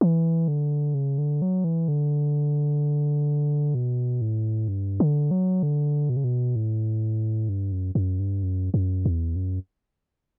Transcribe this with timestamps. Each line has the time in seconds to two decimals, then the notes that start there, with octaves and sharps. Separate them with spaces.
0.01 E3
0.48 D3
0.94 C#3
1.18 D3
1.42 F#3
1.64 E3
1.88 D3
3.75 B2
4.21 A2
4.68 G2
5.00 D3
5.31 F#3
5.63 D3
6.09 B2
6.17 C#3
6.24 B2
6.56 A2
7.49 G2
7.72 F#2
7.95 F#2
8.19 G2
8.43 F#2
8.74 F#2
9.06 E2
9.36 F#2